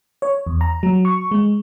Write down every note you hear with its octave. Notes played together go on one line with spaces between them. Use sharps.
C#5
E2
A#5
F#3
C#6
G#3